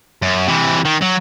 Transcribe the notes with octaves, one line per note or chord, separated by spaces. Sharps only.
F#2
C3 E3
D#3
F#3